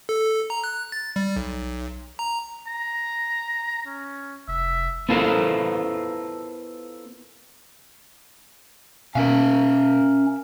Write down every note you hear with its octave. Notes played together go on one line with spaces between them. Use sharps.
A4
A#5
F#6
A6
G3
B1
A#5
A#5
C#4
F1 E5
B3 E4 F4 A4 A#4 C5
B2 C#4 A#4 E5 F5